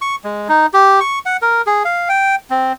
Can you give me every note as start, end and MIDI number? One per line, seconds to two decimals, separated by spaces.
0.01 0.16 85
0.24 0.48 56
0.49 0.66 63
0.73 1.00 67
1.00 1.19 85
1.26 1.37 78
1.42 1.62 70
1.67 1.83 68
1.85 2.09 77
2.09 2.35 79
2.50 2.73 60